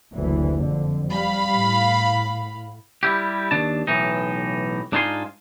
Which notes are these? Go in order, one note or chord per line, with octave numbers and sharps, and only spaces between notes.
F#1 D2 E3
F2 D3
G3 F5 B5
A2
G3 E4 G4
D#2 D#3 D4 A5
B1 A2 E3 D#4
G#2 D4 D#4 F4 G#5 C6